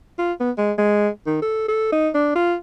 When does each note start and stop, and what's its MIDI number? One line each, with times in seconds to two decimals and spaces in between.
0.18 0.32 65
0.40 0.51 59
0.58 0.72 56
0.78 1.09 56
1.27 1.40 51
1.42 1.64 69
1.68 1.92 69
1.92 2.09 63
2.14 2.31 62
2.35 2.55 65